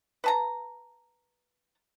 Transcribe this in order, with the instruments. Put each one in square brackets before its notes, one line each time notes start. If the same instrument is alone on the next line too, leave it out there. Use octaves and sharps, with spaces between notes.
[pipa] B4 A5 A#5